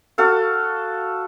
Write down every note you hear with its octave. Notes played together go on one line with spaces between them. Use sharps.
F#4 A4 F5